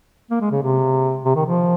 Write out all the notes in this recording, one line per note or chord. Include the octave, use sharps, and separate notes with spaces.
A#3
G#3
C#3
C3
C3
D#3
F3